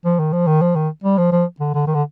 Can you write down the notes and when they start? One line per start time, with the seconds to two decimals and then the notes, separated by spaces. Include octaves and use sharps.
0.05 F3
0.19 D#3
0.33 F3
0.47 D#3
0.62 F3
0.75 D#3
1.04 G3
1.18 F3
1.32 F3
1.60 D3
1.74 D3
1.87 D#3
1.94 D3